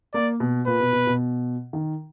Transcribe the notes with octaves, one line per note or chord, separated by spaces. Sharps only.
A#3 D5
B2
A#2 B4
B2
B2
B2
D#3